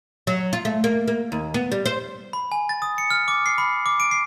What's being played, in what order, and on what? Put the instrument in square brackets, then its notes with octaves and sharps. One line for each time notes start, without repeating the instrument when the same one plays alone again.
[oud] F#3
F4
A3
A#3
A#3
D#2
B3
G3
C5
[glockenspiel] B5
G#5
A6
D#6
C#7
F6
D6
C7
B5
D6
D7
C7